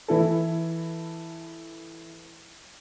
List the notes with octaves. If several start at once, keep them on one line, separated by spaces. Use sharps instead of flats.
E3 E4 A4